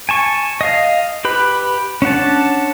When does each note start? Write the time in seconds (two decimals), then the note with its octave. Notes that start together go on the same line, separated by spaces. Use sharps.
0.09 G#5 A5 C#6
0.61 D#5 F5
1.25 G4 B4 B5
2.02 C#4 D4 F#5 A5